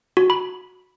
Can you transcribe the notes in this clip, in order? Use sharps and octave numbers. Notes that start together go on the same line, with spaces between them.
F#4
B5